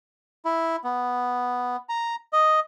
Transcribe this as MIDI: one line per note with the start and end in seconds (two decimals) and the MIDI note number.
0.45 0.76 64
0.84 1.76 59
1.89 2.15 82
2.33 2.60 75